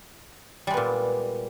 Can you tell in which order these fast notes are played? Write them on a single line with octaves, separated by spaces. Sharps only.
G3 G#3 B3 A#2